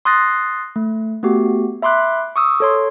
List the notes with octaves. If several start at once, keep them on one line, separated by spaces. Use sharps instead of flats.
C6 D#6 F#6 A6 A#6 C7
A3
A3 B3 F#4 G4
E5 B5 C6 D6 F#6
C#6 D#6 E6
A4 C#5 C6